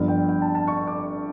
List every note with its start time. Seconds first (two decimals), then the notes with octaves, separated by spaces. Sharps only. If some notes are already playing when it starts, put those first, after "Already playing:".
Already playing: G1 G2 F3
0.08 G5
0.29 G5
0.42 A5
0.55 A5
0.67 C#6
0.87 D6